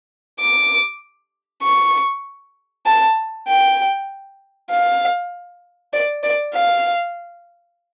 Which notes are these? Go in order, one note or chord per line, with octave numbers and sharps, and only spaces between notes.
D6
C#6
A5
G5
F5
D5
D5
F5